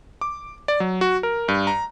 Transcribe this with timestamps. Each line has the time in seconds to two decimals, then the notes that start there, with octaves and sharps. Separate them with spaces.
0.21 D6
0.68 D5
0.80 F#3
1.01 F#4
1.23 A#4
1.48 G2
1.67 A#5